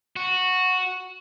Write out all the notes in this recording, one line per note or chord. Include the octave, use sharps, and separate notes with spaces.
F#4